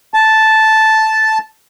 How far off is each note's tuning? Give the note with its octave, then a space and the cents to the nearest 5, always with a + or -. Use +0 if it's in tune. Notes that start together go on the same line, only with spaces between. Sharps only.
A5 -5